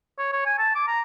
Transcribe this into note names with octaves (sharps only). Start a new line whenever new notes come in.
C#5
C#5
G#5
A5
D6
A#5